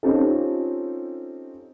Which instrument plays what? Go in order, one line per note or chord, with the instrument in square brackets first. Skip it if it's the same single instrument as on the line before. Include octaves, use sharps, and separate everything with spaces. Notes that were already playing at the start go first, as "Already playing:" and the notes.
[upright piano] C4 C#4 D#4 F4 G4 A4